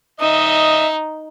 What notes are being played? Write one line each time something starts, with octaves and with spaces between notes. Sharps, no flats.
D#4 D#5 E5